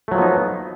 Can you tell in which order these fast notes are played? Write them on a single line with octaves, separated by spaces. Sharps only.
A3 F#3 F3 B3 D#4